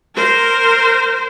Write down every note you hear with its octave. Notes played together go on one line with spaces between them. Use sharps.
A#4 C5